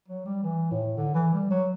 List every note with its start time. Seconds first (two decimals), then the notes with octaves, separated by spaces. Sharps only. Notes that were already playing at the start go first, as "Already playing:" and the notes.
0.08 F#3
0.26 G3
0.43 E3
0.71 A2
0.97 D3
1.15 E3
1.33 G3
1.51 F#3